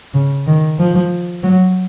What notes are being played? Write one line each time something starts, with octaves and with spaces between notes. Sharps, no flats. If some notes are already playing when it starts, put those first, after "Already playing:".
C#3
D#3
F3
F#3